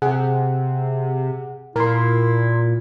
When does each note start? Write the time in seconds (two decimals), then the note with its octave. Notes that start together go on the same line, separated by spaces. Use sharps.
0.02 C3 G#4 F#5
1.76 A#2 E4 A#4 C6